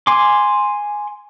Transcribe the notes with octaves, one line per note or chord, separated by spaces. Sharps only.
G#5 C6 D6